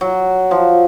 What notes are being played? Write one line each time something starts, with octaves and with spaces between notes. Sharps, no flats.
F#3
F3